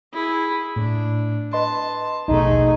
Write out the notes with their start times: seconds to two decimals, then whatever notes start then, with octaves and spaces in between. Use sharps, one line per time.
0.13 E4 G#4
0.76 A2 D4
1.53 B4 D#5 A5 C6
2.28 A#1 D#2 B2 A3 D#4 G#4